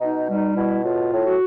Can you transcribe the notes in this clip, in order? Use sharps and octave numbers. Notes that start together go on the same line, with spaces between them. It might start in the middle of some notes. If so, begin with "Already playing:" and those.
B2 D#4
G3 D#4
B2 E4
A2 F4
A2
F#4